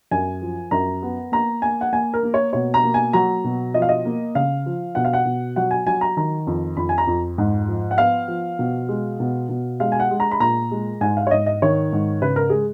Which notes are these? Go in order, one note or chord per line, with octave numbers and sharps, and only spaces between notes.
F#2 G#5
F3
F#2 A#5
B3
A#3 A#5
A#3 G#5
F#5
A#3 G#5
A#4
A#3
C#5
B2 C#5
A#5
A#3
G#5
F#3 A#5
B2
F3 D#5
F5
D#5
A#3
C#3 F5
F3
B2 F#5
F5
F#5
B2
F#3 F#5
G#5
F#3 G#5
A#5
D#3 A#5
F2
F2 B5
G#5
A#5
F2
G#2
F3
F#5
B3 F5
F3
B2
G#3
B2
B2
G#3 F5
G#5
F#5
G#3
A#5
B5
A#2 A#5
G#3
G#2 G#5
F5
C#5
G#2 D#5
D#5
D#3 C#5
G#2
C#3 B4
A#4
G#3 G#4